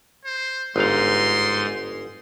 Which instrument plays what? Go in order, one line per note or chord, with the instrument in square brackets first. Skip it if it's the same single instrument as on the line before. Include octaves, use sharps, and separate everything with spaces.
[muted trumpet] C5
[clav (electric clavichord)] G1 F5 [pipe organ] G#2 D#4 [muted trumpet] C6